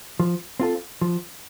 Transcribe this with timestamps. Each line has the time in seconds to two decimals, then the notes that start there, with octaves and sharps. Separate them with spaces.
0.20 F3
0.60 C4 F4 A4
1.01 F3